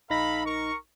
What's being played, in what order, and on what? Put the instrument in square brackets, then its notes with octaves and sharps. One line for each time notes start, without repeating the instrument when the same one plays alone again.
[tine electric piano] A#1 D#4 A#6 [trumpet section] A4 F5 B5
[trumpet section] A#4 C#6